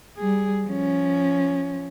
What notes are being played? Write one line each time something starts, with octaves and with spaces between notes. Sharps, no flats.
G3 G#4
F3 C#4